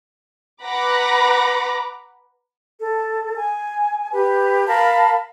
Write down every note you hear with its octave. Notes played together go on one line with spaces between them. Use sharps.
B4 F#5 A#5 B5 D6 A#6
A4
G#5
G4 B4
A#4 F5 A5 B5